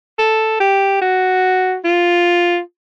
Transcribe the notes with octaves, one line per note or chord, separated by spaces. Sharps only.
A4
G4
F#4
F4